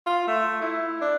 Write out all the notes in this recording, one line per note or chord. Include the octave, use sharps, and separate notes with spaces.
F4
A3
E4
D4